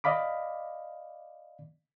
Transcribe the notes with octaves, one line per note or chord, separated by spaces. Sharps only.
D5 D#5 F5 B5 D6